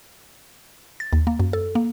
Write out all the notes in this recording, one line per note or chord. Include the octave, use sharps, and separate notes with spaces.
A6
D#2
A#3
F#2
A4
A#3